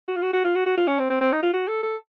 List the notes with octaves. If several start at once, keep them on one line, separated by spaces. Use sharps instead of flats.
F#4
F4
F#4
F#4
F4
F#4
F#4
F4
C#4
C4
C4
C4
D#4
F4
F#4
A4
A4